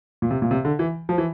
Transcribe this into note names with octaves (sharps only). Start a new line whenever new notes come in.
A#2
C3
A#2
C3
D3
E3
F3
E3